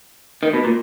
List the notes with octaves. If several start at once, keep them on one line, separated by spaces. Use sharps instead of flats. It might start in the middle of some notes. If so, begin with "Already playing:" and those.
D#3
B2
A#2